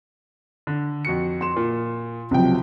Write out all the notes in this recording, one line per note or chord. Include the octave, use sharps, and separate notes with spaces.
D3
F2 F#4 C#7
C6 E7
A#2
C#2 C3 F3 F#3 G5